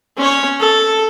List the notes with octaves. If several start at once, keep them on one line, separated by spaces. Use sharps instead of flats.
C#4 C#5
A4